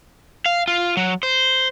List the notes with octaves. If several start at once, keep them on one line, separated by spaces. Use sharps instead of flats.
F5
F4
F#3
C5